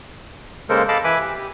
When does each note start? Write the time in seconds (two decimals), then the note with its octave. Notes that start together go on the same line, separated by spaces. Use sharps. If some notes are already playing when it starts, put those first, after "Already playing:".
0.69 C#3 G#3 A#3 A4 A#4 C5
0.88 A4 D#5 F5 A5 B5 D6
1.04 E3 B4 E5 G#5 B5 D6
1.19 G4
1.35 G4